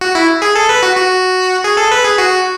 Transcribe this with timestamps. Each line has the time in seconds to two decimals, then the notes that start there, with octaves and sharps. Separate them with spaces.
0.01 F#4
0.15 E4
0.42 G#4
0.56 A4
0.69 B4
0.83 F#4
0.96 F#4
1.64 G#4
1.77 A4
1.91 B4
2.04 G#4
2.18 F#4